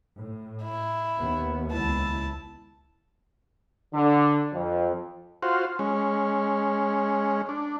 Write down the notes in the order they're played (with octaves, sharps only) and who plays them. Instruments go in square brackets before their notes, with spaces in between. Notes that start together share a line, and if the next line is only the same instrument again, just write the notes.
[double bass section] A2
[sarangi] E4
[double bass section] D#2 B3
[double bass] C#2 E4 [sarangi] A5
[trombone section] D3
F2
[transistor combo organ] F4 F#4 C5
G#3 C#4
D4